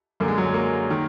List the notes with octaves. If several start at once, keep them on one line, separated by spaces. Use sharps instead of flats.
F#2 D3 A#3
G#3
F#3
G#3
A#3
D#3